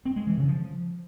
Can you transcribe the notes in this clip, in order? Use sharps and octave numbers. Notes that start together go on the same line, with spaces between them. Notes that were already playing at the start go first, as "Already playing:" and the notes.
C4
G#3
E3
C#3
F3